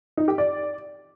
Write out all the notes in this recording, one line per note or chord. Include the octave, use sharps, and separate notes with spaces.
D#4
G4
D5